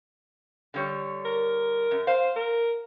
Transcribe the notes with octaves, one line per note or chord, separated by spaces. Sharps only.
D3 G3 C#5
A#4
F#2
C5 F5
A#4